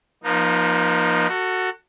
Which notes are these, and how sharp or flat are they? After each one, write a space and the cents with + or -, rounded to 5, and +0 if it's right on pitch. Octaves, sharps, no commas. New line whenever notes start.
F3 +0 A#3 +45 D#4 -15
F#4 +0 A4 +30